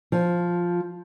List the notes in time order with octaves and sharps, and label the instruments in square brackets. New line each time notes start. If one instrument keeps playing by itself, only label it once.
[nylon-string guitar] F3